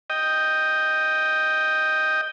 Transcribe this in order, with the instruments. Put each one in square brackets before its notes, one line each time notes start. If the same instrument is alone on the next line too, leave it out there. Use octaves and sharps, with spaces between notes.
[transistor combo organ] D#5 G5